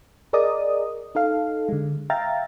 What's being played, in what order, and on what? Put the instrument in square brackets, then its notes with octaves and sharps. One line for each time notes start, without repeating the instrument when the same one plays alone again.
[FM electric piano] G#4 A#4 D5 D#5 D#6
D#4 A4 F5
D3 G#3
E5 F5 G5 A#5 A6